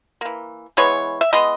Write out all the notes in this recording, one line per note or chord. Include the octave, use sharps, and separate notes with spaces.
E3 A#3
E3 G#3 B3 C#5
E5
E3 G#3 B3 D#5